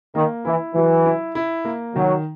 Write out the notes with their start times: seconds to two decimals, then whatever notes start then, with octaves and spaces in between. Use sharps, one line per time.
0.15 D#3 A#3
0.45 E3 E4
0.75 E3 F#3
1.05 E4
1.35 E4
1.65 A#3
1.95 D#3 F#3